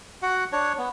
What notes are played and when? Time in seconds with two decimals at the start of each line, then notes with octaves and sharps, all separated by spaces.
0.22 F#4 F#5
0.52 D4 C#5
0.78 B3